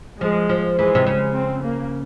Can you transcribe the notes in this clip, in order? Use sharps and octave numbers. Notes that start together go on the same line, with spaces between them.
F3 G#3
F3
E3 G#3
C3
C#3
C4
A#3